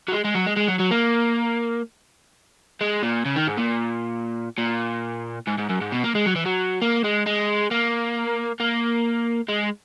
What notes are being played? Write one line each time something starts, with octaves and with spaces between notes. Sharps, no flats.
F#3
G#3
G#3
F#3
G#3
G#3
F#3
F#3
A#3
G#3
A#2
C#3
D#3
G#2
A#2
A#2
G#2
G#2
F#2
G#2
B2
A#3
G#3
F#3
E3
F#3
A#3
G#3
G#3
A#3
A#3
G#3